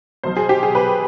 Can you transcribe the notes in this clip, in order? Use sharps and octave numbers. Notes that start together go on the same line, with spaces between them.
B1 B2 C5
G#4
G4
G#4
B4